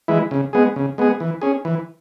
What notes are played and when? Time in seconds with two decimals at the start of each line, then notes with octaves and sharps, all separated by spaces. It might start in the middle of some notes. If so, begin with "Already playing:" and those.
0.08 E3 G#3 E4
0.31 C#3
0.53 G#3 B3 G#4
0.76 C#3
0.98 G#3 B3 G#4
1.20 E3
1.42 C#4 G#4
1.65 E3